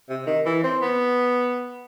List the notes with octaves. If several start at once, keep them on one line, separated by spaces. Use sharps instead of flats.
C3
D#3
E3
C4
B3